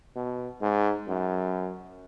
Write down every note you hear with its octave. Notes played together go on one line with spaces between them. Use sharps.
B2
G#2
F#2